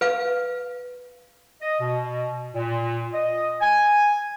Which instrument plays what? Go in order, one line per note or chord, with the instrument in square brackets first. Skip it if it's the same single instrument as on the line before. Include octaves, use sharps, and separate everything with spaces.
[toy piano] B4 F5
[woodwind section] D#5
B2
A#2
D#5
G#5